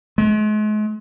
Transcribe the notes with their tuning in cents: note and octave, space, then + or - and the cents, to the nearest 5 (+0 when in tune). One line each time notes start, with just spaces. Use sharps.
G#3 +40